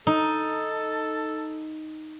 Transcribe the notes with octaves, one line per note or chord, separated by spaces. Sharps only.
D#4 A4